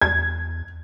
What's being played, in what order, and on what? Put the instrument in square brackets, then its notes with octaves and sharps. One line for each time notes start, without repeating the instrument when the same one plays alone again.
[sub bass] E2 [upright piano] G#6